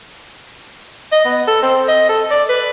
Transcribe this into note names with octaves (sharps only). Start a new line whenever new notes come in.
D#5
B3
A4
C4
D#5
A4
D5
B4